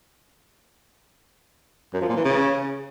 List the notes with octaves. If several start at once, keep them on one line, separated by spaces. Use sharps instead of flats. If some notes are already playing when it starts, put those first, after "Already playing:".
F#2
F3
A#2
E3
C#3